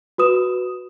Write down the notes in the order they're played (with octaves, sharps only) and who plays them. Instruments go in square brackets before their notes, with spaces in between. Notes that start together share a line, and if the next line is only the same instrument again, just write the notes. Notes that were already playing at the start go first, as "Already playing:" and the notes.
[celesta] F#4 B4 D#6 E7